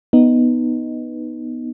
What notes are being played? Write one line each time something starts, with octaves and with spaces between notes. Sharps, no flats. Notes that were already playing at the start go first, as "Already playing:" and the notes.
B3 D#4